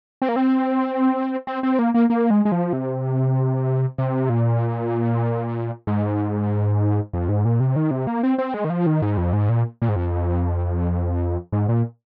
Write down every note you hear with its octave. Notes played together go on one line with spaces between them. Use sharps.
C4
A#3
C4
C4
C4
A#3
A#3
A#3
G#3
G#3
F3
C3
C3
A#2
G#2
F2
G#2
A#2
C3
D#3
C3
A#3
C4
C4
G#3
D#3
F3
D#3
G#2
F2
G#2
A#2
A#2
G#2
F2
G#2
A#2